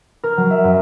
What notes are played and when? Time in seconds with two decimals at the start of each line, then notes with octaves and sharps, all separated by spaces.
0.24 A#4
0.37 F#3
0.50 E5
0.64 F#2